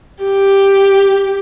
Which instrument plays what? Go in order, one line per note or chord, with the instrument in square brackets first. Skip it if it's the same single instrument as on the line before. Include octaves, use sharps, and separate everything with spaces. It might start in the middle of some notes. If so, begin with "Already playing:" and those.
[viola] G4